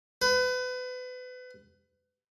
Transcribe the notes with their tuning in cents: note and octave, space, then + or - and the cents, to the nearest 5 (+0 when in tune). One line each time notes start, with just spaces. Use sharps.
B4 +30